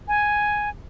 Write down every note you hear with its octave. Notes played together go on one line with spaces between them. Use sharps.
G#5